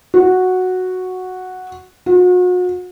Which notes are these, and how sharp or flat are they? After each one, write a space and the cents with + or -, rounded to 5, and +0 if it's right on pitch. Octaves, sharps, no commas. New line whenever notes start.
F#4 -5
F#4 -40